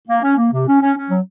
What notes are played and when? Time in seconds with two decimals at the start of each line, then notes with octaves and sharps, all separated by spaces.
0.08 A#3
0.22 C#4
0.36 A#3
0.52 C3
0.67 C#4
0.81 C#4
0.96 C#4
1.10 F#3